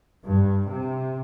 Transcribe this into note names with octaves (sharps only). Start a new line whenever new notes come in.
G2
C3